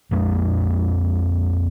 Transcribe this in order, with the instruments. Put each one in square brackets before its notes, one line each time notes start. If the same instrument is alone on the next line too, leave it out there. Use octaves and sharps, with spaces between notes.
[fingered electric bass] A#1 F2 G#3